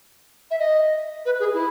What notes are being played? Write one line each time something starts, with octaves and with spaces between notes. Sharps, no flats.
E5
D#5
B4
G#4
E4